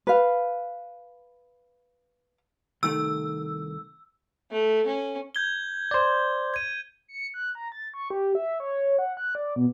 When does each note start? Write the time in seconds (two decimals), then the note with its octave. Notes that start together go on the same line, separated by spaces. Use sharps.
0.07 B4 F5
2.83 C2 D#3 A3 E6
4.51 A3
4.87 C#4
5.35 G6 G#6 G7
5.91 C5 D5
6.54 G#6 D#7
7.08 C#7
7.34 F#6
7.55 A#5
7.72 A6
7.94 C#6
8.10 G4
8.35 E5
8.60 C#5
8.99 F#5
9.17 F#6
9.35 D5
9.56 B2